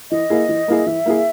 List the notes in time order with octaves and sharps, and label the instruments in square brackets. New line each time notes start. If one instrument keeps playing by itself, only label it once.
[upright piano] E3 [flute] D#5
[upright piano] A#3 E4 G#4
E3
A#3 E4 G#4
[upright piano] E3 [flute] E5
[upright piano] A#3 E4 G#4